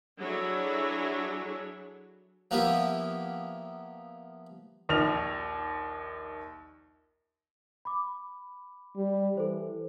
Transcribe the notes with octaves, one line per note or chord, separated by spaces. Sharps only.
F#3 D4 E4 G#4 A4 C#5
F3 A#3 B3 E4 G4
A#1 D#2 F6 F7
B5 D6
G3
E3 A4 C5